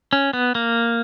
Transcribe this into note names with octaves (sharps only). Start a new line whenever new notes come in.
C#4
B3
A#3